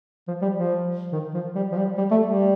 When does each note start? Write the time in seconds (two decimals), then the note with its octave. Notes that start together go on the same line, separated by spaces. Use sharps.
0.28 F3
0.42 G3
0.57 F3
1.12 D#3
1.34 F3
1.55 G3
1.72 F3
1.77 G3
1.98 G3
2.11 A3
2.26 G3